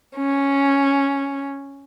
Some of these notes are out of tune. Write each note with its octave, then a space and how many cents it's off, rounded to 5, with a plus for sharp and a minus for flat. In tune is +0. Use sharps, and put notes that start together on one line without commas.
C#4 +0